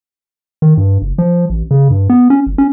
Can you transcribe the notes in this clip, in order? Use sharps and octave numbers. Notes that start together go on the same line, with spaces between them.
D#3
G2
F#1
F3
A1
C#3
G2
B3
C#4
G1
C#4